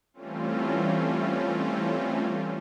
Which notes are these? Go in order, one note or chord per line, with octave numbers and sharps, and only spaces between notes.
E3 G3 A3 C4 C#4 F4